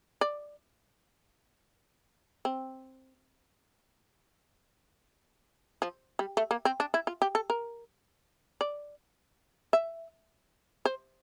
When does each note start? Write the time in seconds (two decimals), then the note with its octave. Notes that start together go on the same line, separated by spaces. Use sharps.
0.21 D5
2.45 C4
5.82 F3
6.19 G3
6.37 A3
6.51 A#3
6.65 C4
6.80 D4
6.94 E4
7.07 F4
7.22 G4
7.35 A4
7.50 A#4
8.61 D5
9.73 E5
10.85 C5